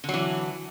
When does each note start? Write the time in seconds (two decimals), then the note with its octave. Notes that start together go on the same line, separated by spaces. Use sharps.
0.04 D3
0.09 F#3
0.14 E3